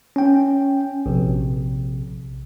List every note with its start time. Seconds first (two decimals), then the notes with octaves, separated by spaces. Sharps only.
0.16 C#4 G5
1.06 A#1 C3